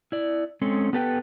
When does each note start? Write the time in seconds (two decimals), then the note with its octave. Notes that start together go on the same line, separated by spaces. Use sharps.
0.12 E4 D5
0.61 G#3 C4 C#4 A4
0.93 B3 G4 A4 B4 G5